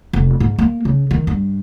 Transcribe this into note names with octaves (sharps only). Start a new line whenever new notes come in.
F1
G#2
A#3
C#3
D#3
G2